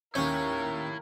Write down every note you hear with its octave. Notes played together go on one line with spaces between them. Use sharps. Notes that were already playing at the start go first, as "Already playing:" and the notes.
D#2 C#4 E4 A#4 C#5 G6